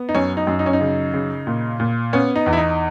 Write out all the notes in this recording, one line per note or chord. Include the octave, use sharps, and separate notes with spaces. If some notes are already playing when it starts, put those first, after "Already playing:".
Already playing: B3
D#4
F#2 C#4
D#4
F#2
D#4
C#4
D#4
C#3
C#3
A#2
A#2
B3 C#4
D#4
E2
E4
D#4